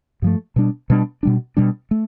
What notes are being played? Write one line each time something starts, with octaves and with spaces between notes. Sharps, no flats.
G2 F3 A3
B2 G3 D4
B2 G3 D4
B2 G3 D4
B2 G3 D4
A3